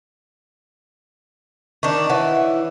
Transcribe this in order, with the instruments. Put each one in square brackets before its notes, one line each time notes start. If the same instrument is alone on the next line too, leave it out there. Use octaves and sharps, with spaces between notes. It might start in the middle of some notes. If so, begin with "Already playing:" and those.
[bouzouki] D#3 D4 [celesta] C#6
[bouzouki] E3 [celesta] C#5 E5 F#5